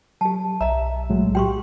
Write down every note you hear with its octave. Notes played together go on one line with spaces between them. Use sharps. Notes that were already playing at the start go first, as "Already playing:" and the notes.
F#3 G4 A5
B1 D#5 E5 A#5
A2 F#3 G#3
F#4 G4 G5 C6 C#6